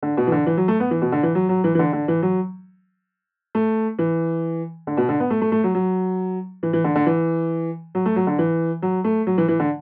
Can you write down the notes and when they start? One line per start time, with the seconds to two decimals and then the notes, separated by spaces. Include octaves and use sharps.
0.03 D3
0.17 B2
0.27 E3
0.32 D3
0.46 E3
0.57 F#3
0.68 A3
0.80 B3
0.91 E3
1.02 B2
1.12 D3
1.23 E3
1.35 F#3
1.49 F#3
1.64 E3
1.75 E3
1.79 D3
1.93 D3
2.08 E3
2.22 F#3
3.55 A3
3.99 E3
4.87 D3
4.97 B2
5.09 D3
5.20 B3
5.30 A3
5.42 A3
5.52 A3
5.64 F#3
5.75 F#3
6.63 E3
6.73 E3
6.84 D3
6.95 D3
7.06 E3
7.95 F#3
8.06 A3
8.16 F#3
8.27 D3
8.39 E3
8.82 F#3
9.04 A3
9.27 F#3
9.38 E3
9.48 E3
9.60 D3